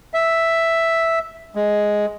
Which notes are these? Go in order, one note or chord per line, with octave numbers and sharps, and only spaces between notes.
E5
G#3